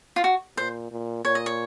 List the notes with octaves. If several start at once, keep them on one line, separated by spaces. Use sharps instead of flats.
F4
F#4
A#2 C5
A#2
A#2 C#5
D#5
C#5